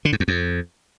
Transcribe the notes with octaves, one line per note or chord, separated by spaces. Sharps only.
D3
G#2
E2
F2